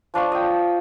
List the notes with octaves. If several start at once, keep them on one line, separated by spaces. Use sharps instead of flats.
F3 D4 F4 C#6
D#5 G5